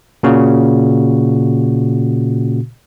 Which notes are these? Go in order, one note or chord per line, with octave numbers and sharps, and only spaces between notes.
A#2 C#3 F#4